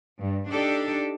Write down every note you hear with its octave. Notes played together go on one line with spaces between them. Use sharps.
G2
D4 D#4 G4 A4 D5